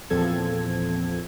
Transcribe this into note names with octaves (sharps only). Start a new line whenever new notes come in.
E2 A#2 F3 C4 A4 G#6